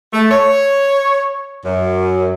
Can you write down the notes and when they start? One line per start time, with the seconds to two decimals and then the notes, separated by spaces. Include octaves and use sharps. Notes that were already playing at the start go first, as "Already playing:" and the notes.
0.13 A3
0.31 C#5
1.65 F#2